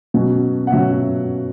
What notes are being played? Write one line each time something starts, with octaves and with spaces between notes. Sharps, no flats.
B2 F#3 C#4
F#5
B2 F#3 C#4 E5